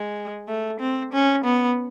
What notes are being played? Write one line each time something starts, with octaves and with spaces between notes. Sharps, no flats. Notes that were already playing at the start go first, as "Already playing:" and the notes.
Already playing: G#3
A3
C4
C#4
B3